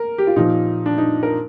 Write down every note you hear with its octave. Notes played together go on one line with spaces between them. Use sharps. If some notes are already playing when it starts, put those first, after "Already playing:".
Already playing: A#4
G4
F4
A#2 F3 D#4
D4
D#4
A#4